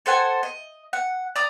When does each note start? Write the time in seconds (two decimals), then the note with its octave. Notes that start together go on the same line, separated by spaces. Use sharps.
0.06 A4 C5 F#5 G#5
0.43 D#5
0.93 F#5
1.35 D5 A#5 D6 D#6